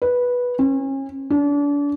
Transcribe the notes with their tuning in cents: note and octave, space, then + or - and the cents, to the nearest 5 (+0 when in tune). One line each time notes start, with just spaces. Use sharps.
B4 -10
C#4 -35
D4 -35